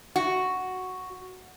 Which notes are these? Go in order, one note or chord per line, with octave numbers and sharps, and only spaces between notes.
F#4